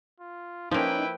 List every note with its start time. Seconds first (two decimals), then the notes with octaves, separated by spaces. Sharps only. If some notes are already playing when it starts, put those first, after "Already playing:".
0.20 F4
0.71 F3 A#3 C#4 D#4 E4 B4 G5